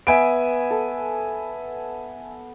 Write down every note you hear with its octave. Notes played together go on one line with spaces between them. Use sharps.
B3 E5 G#5 D7
A4